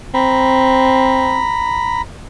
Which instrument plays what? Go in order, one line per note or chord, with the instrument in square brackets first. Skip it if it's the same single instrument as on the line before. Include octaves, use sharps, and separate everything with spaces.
[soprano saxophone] C4 [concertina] A#5 B5